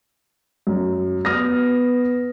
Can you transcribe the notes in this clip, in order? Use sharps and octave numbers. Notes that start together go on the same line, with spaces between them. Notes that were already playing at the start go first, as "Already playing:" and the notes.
F#2
B3 D#6 F6 A#6